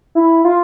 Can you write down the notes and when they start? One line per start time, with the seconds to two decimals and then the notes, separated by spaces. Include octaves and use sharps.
0.15 E4
0.45 F4